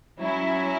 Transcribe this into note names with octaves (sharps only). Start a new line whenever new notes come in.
F#3 C#4 E4